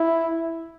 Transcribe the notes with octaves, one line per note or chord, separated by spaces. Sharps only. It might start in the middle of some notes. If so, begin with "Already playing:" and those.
Already playing: E4